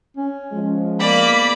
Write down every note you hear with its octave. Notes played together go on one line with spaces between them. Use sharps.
C#4
F3 G#3
A#3 B3 D5 B5